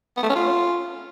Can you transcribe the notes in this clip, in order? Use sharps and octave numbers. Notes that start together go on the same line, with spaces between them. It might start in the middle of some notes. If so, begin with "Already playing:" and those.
B3
A3
C#4
F4